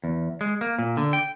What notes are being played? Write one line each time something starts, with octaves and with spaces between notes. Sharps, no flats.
E2
G#3
A#3
A#2
D3
G5